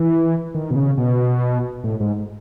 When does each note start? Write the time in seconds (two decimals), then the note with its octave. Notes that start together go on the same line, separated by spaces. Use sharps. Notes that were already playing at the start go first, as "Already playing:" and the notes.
Already playing: E3
0.54 D#3
0.71 B2
0.76 C#3
0.98 B2
1.84 A2
2.00 G#2